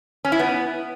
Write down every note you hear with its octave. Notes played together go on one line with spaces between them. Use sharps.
C#4
E4
B3